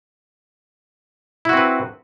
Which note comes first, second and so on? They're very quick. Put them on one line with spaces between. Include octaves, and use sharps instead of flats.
E4 F#4 C4 B4